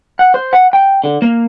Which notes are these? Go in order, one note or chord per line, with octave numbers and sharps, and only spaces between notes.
F#5
C5
F#5
G5
D3
A#3